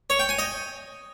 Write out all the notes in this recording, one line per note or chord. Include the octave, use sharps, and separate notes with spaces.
C#5
G5
G#5
D#5